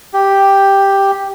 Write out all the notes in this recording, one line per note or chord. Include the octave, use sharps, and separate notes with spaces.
G4